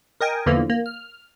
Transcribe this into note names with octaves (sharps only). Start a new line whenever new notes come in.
A#4 D#5 G5 G#5
E2 D3 E3 F3 A#3
A#3
F6